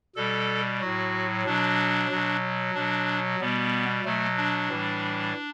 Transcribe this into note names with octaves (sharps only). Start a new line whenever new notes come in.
B2 G3 A4
A2 F#3 F#4
B2 F#3 D4
B2 F#3
B2 F#3 D4
B2 G3 B3
B2 F#3 A3
D4
A2 E3 G3